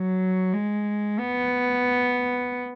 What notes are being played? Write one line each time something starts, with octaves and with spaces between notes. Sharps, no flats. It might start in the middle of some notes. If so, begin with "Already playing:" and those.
Already playing: F#3
G#3
B3